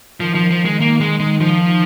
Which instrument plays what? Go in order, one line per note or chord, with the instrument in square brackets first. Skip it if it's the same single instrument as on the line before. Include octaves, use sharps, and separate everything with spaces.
[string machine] D#3 [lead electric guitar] F3
[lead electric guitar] F3
F3
G#3
A#3
G#3
G#3
F3